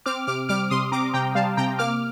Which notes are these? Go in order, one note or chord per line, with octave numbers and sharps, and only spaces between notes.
C4 D6 F6
C3 D6 F6
G3 D6 F6
C3 C6 D#6
C4 A#5 D6
C3 G5 A#5
G3 F5 A5
C3 G5 A#5
A#3 D6 F6